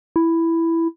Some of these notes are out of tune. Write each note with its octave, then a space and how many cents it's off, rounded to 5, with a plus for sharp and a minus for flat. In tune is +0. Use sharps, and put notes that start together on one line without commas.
E4 +5